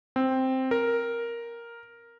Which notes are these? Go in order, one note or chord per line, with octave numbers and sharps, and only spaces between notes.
C4
A#4